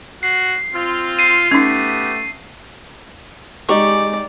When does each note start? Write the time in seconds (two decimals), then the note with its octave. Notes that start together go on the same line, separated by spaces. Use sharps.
0.23 F#4 C7
0.74 C4 F4
1.19 C7 D#7
1.52 A3 B3 C#4 D#4 G4
3.69 G#3 D#4 G4 D5 C#6